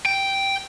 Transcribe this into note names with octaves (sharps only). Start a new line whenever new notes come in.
G5